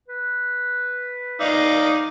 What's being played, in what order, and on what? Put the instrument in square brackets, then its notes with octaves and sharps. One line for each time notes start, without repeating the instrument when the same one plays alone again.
[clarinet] B4
[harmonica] D#4 D5 F5